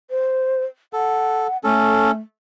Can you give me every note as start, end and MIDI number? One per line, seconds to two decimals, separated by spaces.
0.10 0.64 72
0.93 1.47 69
0.93 1.57 78
1.64 2.17 57
1.64 2.11 61
1.64 2.11 69